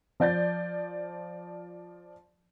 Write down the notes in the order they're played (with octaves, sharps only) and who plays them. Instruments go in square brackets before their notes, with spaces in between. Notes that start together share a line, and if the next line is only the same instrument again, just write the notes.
[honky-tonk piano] F3 D5 G6 A6